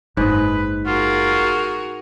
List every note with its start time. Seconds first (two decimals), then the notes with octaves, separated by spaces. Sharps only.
0.17 F#1 G#2 B4 D#5
0.86 F4 F#4 G#4 A#4